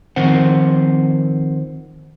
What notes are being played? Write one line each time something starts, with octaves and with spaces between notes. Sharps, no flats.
D#3 F3 C4 C5 F#5